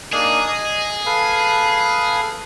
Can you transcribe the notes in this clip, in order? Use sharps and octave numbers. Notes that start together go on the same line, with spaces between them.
A#3 D4 D#4 G#4
D#5
A4 B4 F5